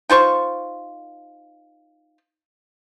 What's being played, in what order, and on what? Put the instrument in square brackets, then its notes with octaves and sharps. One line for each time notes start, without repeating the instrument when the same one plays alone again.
[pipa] D#4 F4 C5 C#6